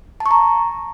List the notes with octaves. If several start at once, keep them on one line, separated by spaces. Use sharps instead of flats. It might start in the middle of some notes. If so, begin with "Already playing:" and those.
A5
C#6
A#5